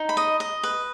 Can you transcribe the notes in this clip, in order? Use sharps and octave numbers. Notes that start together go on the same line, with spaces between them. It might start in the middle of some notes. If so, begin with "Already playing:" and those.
Already playing: D#4
B5
D#5
D#5
B4